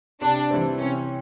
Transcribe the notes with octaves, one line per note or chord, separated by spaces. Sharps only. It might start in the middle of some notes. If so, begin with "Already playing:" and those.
C3 D4
E3 G3 C4
C3 C#4